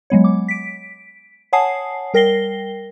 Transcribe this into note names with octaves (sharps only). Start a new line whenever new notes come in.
F#3 G#3 B3 C#5
D6
B6 D7
C#5 F#5 G#5 A5 D#6 C7
G3 A#4 G5 A#6 C7 G7